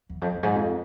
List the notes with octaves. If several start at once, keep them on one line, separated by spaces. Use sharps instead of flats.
E2
F2
F2
G#2
F2